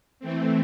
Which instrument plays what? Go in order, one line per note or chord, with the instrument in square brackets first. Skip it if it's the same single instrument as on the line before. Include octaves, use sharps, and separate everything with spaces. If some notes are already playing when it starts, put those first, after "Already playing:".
[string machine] E3 A3 C4